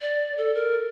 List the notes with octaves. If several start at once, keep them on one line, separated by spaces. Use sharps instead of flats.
D5
A4
A#4